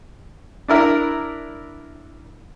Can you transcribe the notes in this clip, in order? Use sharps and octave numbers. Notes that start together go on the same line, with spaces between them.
D4 E4 A#4 D5 E5